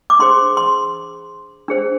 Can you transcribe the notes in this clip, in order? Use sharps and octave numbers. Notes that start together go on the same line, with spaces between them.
D6
D4 G#4 C5 C6
C6
D4 G#4 C5